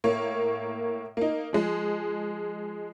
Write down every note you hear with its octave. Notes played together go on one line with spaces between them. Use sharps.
A2 A#3 C#5
A#3 D#4
F3 G#3